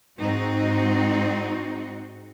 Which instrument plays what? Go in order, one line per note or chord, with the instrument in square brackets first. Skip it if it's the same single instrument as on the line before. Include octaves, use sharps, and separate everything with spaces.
[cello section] G#2 C4 D#4 F#4